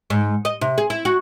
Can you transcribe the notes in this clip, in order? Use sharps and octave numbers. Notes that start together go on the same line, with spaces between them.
G#2
D#5
C3
G#4
E4
F#4